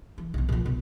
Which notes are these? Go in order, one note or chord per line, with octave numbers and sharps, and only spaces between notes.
E3
B1 E3
A#2 F3
B1 B2